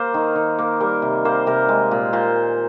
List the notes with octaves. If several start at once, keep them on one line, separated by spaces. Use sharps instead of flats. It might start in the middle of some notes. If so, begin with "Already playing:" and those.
Already playing: A#3 C5
D#3
D#3
A#3
G3 A#4
C3
A#3 C5
C3 A#4
G#3
A#2
A#2 C5